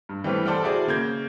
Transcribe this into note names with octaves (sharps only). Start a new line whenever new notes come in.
G2
E3 G3 A3 C4 B4
A4 C5 D5 F#5 G5 F6
E4 F#4 G#4 C5 D5
C#3 A#3 G6 G#6